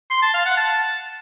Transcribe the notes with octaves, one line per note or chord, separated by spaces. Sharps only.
C6
A5
F5
F#5
A5